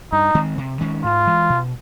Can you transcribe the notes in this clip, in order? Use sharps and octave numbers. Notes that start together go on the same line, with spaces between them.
G2 D#4
D#3 G#3 C4
C3
D#3 G#3 C#4
G#2 F4
E3 G#3
B2